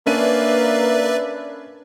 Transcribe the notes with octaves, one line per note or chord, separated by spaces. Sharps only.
A#3 C#4 D4 B4 D5 E5 D#7